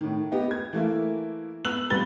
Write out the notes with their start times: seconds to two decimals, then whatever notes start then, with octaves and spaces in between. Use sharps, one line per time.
0.01 A2 D#3
0.32 B3 G4 D#5 G5
0.51 G#6
0.73 E3 A3 A#3 E4
1.65 B3 E6 F#6 F#7
1.90 G1 C3 B3 B4 A6 G7